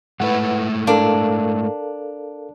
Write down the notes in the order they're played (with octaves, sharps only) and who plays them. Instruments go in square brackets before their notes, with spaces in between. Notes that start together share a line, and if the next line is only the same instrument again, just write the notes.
[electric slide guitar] G#2 A3 E4 [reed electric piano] B4 F#5
[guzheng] D4 [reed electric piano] A4 A#4 F5